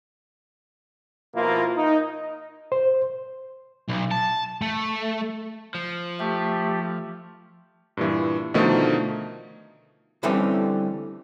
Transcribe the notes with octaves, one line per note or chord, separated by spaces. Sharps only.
B2 F3 A#3 E4 F4 A#4
D#4
C5
B1
A5
A3
F3
A3 G4
G2 A#2 E3
B2 D3 D#3 F3 A3 D#4
D3 E3 G3 A3 C4 C#4